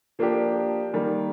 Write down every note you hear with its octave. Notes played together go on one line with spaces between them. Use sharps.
F3 A#3 D4 G4
D#3 G3 A#3